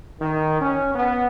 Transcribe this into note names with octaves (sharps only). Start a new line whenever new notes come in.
D#3
C#4
B3